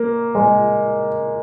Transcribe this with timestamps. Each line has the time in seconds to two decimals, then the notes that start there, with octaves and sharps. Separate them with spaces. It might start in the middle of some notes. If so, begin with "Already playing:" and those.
Already playing: A#3
0.35 G#3